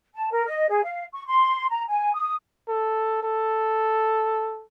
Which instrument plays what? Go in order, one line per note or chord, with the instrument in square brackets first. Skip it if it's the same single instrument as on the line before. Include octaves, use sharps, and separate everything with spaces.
[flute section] A5
A#4
D#5
G#4
F5
C#6
C6
A#5
G#5
D#6
[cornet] A4
A4